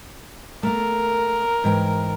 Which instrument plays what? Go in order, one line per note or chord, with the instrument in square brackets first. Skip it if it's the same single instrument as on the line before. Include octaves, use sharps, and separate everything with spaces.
[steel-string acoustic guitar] A3 A#3 [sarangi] A#4
[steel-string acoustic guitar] G#2 E3 G5